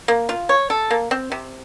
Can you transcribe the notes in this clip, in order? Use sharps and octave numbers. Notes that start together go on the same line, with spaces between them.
A#3
F4
C#5
A4
A#3
C4
C3